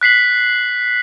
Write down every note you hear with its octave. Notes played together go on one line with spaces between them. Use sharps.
F#6 B6 C7 F#7